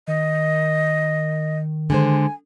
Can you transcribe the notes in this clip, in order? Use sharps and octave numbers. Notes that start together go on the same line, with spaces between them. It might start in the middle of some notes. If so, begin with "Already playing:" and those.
D#3 D#5
D3 G#3 C5 G#5